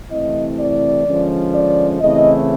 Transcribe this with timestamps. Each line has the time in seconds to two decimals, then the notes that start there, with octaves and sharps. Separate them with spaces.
0.10 C3 E3 A3 C4 E4 D#5
0.57 D5
1.05 D3 F3 G#3 C#4
1.53 D5
2.00 C#3 E3 A3 C4 E4 D#5